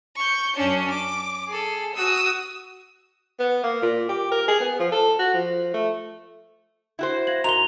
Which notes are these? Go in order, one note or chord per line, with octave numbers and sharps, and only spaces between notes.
C#6 G6
F#2 C#4 D4
D6
G#4 A4
F#4 D#6 E6
B3
A#3
A#2
G4
A#4
G#4
B3
F3
A4
F#4
F3
A3
E4 F#4 C5
F5 G#6 A#6 F#7
G#2 F#4 A#4 A#5 C6 F7 G7